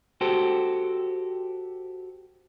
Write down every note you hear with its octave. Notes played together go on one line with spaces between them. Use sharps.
F#4 G4 A4 C5